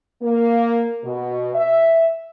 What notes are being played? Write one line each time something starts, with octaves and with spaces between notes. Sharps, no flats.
A#3
B2
E5